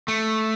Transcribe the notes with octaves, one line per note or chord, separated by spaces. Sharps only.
A3